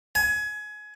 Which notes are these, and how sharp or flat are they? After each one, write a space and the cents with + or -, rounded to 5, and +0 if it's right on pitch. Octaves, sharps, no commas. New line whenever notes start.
G#5 +25